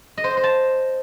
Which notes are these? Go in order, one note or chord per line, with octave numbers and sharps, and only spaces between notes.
D#5
C5
D#5
C5
A5